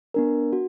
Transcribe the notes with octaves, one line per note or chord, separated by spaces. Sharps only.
B3 D4 A#4
F#4